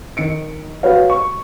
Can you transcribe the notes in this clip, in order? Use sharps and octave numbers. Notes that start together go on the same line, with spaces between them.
D#3 C#7 D7
F#4 B4 C#5 F5
C#6